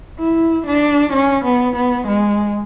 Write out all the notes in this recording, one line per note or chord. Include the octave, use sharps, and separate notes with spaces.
E4
D4
C#4
B3
B3
G#3